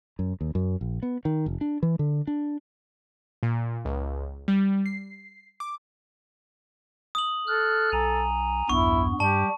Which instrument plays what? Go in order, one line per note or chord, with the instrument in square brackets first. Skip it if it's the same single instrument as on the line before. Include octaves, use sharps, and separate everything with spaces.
[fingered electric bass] F#2
D#2
F#2
A#1
B3
D#3
F1
D4
E3
D3
D4
[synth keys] A#2
C#2
G3
C7
D6
[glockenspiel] D#6 F#7
[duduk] A4 [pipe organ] F6 F#6
[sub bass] B1 [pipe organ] G#5 A#5
[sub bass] B1 [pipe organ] E2 G2 B3 [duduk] E4 [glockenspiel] C#6
[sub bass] G2 [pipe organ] G3 [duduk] G4 [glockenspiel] A5